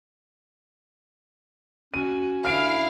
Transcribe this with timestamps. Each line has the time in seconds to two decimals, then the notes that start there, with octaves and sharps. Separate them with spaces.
1.94 C#4 F#4 D#7
2.45 D3 E4 F5 F6 D7